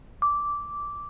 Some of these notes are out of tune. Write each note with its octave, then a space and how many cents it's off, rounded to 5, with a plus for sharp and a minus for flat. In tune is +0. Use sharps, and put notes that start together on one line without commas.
D6 -10